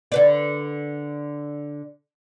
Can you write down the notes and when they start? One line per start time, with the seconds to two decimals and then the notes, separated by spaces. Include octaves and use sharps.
0.12 D3 B4 D5